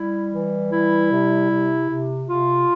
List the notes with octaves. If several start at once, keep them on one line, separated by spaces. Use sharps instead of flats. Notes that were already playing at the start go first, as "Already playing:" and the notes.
Already playing: G3 E4
E3
G3 E4
C3
C3
C3
C3 F4